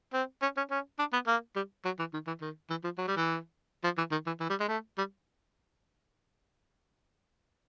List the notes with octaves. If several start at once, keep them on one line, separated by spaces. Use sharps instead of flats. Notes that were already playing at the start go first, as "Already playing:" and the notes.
C4
C#4
C#4
C#4
D4
B3
A#3
G3
F#3
E3
D#3
E3
D#3
E3
F3
F#3
G3
E3
F3
E3
D#3
E3
E3
G3
G#3
A3
G3